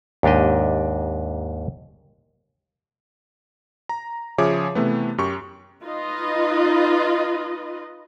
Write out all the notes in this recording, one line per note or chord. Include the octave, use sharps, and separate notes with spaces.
D#2 G#2 D4 G4 D#5
A#5
C#3 F3 G#4 C#5 E5 D6
C3 E3 A3 B3
F#2 G4 C#6
D#4 F4 B4 D#5